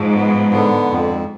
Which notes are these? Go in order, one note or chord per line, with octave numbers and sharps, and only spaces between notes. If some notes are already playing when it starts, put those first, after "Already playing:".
Already playing: G#2 F3
B3
D3
F2